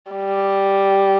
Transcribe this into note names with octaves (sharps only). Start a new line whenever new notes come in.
G3